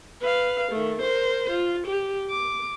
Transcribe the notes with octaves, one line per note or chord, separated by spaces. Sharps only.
B4 F5
D#3 A3
A#4 C5
F4
G4
D6